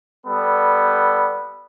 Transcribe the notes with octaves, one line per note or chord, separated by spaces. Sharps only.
G3 B3 A4